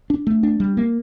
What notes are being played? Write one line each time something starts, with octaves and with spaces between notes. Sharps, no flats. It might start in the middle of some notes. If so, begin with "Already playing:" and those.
D4
A3
D4
G3
A#3